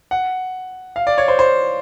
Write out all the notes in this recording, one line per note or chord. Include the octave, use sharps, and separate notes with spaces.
F#5
F5
D5
C#5
C5
C5